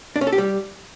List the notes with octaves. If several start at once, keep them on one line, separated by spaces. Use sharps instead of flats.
D4
C#4
A4
G4
G3